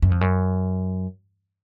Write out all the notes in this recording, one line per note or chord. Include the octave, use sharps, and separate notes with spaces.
F#2
F2
F#2